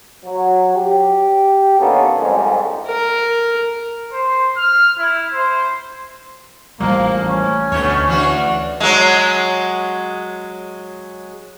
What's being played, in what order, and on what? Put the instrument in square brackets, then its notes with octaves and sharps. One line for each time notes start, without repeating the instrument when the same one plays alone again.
[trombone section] F#3
G4
D3 A#3 B3 C#4 D#4 A4
C2 F2 G#2
[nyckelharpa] A#4
[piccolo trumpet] C5
F6
E4
C5
[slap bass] A1 G3 [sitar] F3 [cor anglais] A#3
[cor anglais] C#4
[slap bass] D2 [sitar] B2 A3 C#5
[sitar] E3 D4 F#4
F#3 G#3